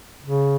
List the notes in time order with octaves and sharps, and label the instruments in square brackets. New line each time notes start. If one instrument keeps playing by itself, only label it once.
[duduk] C#3